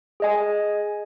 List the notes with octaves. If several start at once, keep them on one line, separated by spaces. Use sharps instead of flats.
G#4 D#5 G#5